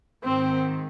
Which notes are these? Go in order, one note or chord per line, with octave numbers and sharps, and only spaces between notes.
G#2 D#3 C4